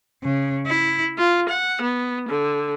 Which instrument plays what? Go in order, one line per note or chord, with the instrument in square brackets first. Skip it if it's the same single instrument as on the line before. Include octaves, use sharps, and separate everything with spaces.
[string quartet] C#3
E4
F4
F#5
B3
D3